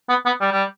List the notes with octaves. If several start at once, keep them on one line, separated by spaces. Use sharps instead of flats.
B3
B3
G3
G3